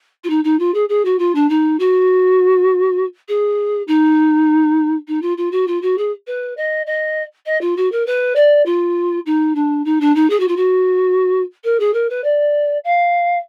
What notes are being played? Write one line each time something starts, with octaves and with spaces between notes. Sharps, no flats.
F4
D#4
D#4
F4
G#4
G#4
F#4
F4
D4
D#4
F#4
G#4
D#4
D#4
F4
F4
F#4
F4
F#4
G#4
B4
D#5
D#5
D#5
F4
F#4
A#4
B4
D5
F4
D#4
D4
D#4
D4
D#4
G#4
F#4
F4
F#4
A#4
G#4
A#4
B4
D5
F5